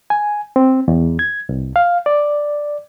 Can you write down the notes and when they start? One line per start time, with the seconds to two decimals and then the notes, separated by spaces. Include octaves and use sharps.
0.10 G#5
0.56 C4
0.88 E2
1.19 G#6
1.49 C2
1.76 F5
2.06 D5